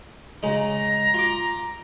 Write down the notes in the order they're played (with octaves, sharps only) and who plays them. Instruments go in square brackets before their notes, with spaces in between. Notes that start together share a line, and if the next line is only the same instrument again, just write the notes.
[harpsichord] C#3 G#3 D#4 [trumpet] A#5
[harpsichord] F4 C6 D6